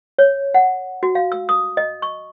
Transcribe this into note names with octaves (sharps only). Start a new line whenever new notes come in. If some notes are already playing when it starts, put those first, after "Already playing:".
C#5
F#5
F#4
F5
E6
D#6
D#5
C#6